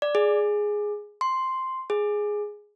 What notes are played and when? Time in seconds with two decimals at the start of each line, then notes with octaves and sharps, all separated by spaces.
0.02 D5
0.15 G#4
1.21 C6
1.90 G#4